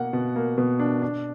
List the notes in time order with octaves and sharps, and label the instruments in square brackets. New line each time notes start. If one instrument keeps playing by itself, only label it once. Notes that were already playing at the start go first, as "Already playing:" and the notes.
Already playing: [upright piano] B2 A#3 F#5
B2
A#3
B2
D4
D4